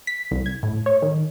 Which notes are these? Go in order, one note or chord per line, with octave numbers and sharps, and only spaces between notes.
B6
C2
G#6
A2
C#5
D#3